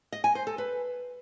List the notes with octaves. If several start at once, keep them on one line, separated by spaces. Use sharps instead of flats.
D#5
G#5
C5
A4
B4